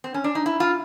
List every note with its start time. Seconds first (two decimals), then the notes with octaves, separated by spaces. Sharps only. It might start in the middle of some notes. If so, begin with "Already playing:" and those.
0.04 C4
0.14 C#4
0.24 D4
0.35 D#4
0.46 E4
0.60 F4